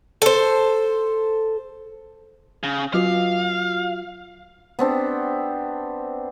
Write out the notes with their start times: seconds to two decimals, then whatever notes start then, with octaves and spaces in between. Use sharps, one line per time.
0.22 A4 C5
2.63 C#3
2.94 F#3 F4 F#4 F5
4.79 B3 C4 D4 G4